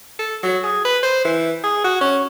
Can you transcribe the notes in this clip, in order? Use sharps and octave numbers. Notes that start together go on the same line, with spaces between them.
A4
F#3
G#4
B4
C5
E3
G#4
F#4
C#4